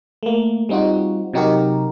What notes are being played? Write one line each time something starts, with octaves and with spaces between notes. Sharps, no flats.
A3 A#3
G3 C4 D#4 F4 F#4
C3 F#3 D#4 F#4 G4 A#4